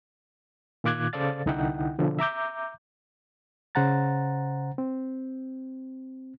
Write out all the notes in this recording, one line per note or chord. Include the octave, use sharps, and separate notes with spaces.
A#2 D#3 F4 D6 F#6 G#6
C#3 A4 C5 D5 F5 A6
C2 D3 D#4 E4 F#5 G5
B2 D3 F3
E5 A#5 D6 G6
C#3 C5 F#5 A#5 A6
C4